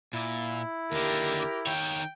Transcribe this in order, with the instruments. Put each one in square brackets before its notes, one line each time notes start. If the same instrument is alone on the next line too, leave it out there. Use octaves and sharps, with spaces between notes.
[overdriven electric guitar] A#2 [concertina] E4
[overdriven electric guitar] D#2 D3 [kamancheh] G4 A#4
[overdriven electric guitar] D#3 C#5 [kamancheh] G5